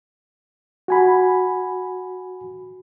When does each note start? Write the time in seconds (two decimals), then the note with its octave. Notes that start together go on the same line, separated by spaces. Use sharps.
0.88 F#4 G#5 B5